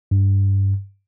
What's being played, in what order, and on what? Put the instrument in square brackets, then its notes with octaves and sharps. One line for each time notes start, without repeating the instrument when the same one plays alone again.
[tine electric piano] G2